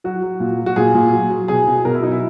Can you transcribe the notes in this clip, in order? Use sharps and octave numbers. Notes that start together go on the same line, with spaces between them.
F#3 F#4
F#3
A#2
F#3
F#4
A#2 G#4
A#2
F#3
F#3
B2 G#4
B2
B2 A#4
E4
F#3 D#4
E4